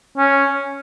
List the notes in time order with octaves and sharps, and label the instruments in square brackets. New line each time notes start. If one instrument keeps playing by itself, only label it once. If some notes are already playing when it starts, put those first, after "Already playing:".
[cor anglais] C#4